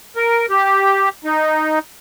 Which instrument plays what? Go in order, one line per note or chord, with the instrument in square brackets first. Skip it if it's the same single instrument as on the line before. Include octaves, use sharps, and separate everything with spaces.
[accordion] A#4
G4
D#4